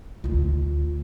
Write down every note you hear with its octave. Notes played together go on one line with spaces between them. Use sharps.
D2 F4